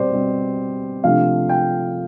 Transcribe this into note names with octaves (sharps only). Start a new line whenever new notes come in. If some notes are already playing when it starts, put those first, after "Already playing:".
Already playing: B2 G3 C4 C5 D5
B2 G3 C4
C3 F3 A3 D4 F5
G5